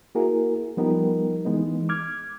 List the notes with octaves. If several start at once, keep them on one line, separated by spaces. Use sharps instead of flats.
A#3 E4 F#4 G#4 A#4
F3 G3 B3 D#4 G4 A#4
E3 G#3 B3 D#4
D6 F6 G#6